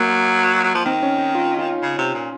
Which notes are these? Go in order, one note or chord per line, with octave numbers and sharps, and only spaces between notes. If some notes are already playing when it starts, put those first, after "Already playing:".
Already playing: F#3 A#3
F#3
F3
D#3 C4
C#4
D#4
F4
F4
C#3
C3
A#2